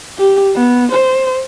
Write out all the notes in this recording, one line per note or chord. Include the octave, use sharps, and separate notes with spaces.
G4
B3
C5